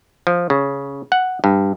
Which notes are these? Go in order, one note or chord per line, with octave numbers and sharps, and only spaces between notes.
F3
C#3
F#5
G2